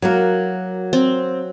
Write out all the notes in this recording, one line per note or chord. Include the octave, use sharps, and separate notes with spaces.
F#3 A#3 F#4 A#4
C4